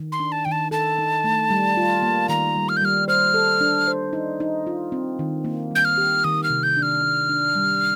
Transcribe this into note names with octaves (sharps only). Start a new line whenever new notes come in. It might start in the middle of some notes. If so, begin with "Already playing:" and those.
Already playing: D#3
C6
D4
A5
D#3 G5
A5
A4 A5
D#4
A3
G3
F4
A#3
D#3 A#5
G3
F6
G6
G3 F6
C5 F6
A4
D4
C5
D#4
D#4
F4
C4
D#3
A#3
G3 G6
F6
G4
D#3 D#6
F6
C3
G6
D4
F6
D4
D4
G3